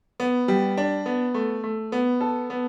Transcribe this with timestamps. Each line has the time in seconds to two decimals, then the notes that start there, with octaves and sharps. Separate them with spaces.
0.20 B3
0.48 G3
0.77 D4
1.06 B3
1.34 A3
1.64 A3
1.92 B3
2.21 A4
2.50 B3